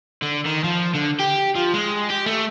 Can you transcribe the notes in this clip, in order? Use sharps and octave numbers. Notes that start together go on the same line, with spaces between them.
D3
D#3
F3
D3
G4
F3
G#3
G4
A3